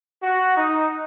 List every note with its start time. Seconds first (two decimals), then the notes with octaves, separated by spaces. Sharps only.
0.22 F#4
0.56 D#4